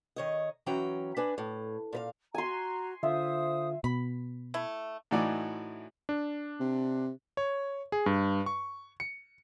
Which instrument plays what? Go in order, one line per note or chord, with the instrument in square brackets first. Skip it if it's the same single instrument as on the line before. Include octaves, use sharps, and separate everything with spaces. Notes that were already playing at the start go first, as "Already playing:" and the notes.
[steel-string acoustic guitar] D#3 C#5 D#5
E3 F#3 C#4 G5 A#5
D4 B4 G#5
A2
A#2 B4 F5
[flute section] F#4 A#5 [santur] G#5 C6
[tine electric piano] D3 F4 [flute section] C5 D#6 [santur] E5
[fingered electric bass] B2 [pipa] B5
[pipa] A3 E4
[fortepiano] A2 E3 D#4 F#4 D5
[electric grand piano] D4
[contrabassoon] C3
[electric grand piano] C#5
G#4
G2
C#6
C#7